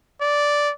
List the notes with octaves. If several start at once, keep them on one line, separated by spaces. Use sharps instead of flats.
D5